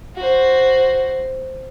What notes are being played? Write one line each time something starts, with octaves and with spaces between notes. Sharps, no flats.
F#4 C5